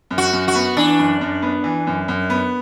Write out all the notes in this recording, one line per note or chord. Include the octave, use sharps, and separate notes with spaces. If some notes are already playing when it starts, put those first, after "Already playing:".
F#2
F#4
F#2
F#4
B3
E3 D4
F#2
F#2
B3
E3
F#2
F#2
B3